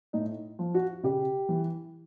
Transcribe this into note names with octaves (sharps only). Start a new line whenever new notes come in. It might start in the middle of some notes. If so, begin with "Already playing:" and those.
A2 D#4
F3
F#4
C#3 G4
E3